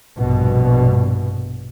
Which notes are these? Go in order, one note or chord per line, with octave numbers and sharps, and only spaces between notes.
A#1 G2 B2